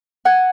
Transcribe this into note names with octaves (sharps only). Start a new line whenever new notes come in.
F#5 G#5